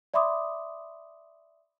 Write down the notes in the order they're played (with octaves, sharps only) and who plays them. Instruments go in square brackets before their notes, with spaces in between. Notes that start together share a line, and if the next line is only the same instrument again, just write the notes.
[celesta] D5 E5 B5 C6 D6 D#6